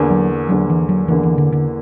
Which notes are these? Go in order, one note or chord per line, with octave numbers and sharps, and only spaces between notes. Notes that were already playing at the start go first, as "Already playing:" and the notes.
Already playing: E2 D3 A#3
F#3
E2 D3 F#3 A#3
E3
F#3
E2 D3 E3 A#3
E3
D3
D3